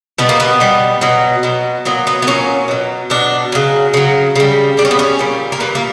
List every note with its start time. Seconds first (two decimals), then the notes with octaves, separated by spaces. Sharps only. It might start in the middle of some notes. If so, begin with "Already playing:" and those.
0.18 B2 G3 B3
0.29 A#3
0.40 B3
0.60 B2 G3
1.01 B2 F#3
1.43 B2 F#3
1.85 A#2 F#3 B3
2.07 B3
2.22 B3
2.27 A#2 F#3 C#4
2.68 B2 F#3
3.10 B2 F#3 D4
3.52 C#3 F#3
3.94 C#3 F#3
4.36 C#3 G3
4.77 C#3 G3 D4
4.85 C#4
4.91 B3
4.99 C#4
5.19 A#2 G3
5.52 A#3
5.60 A#2 G3 B3
5.75 A#3